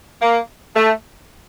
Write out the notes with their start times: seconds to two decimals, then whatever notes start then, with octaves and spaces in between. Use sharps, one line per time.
0.22 A#3
0.76 A3